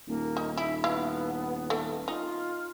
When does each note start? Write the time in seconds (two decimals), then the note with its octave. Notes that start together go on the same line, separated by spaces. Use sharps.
0.08 D#1 A#3
0.37 D#4
0.57 E4 E5
0.84 B3 E4 F5
1.70 A3
2.08 D#4 F4